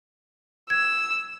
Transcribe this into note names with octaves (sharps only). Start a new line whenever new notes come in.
E6 G#6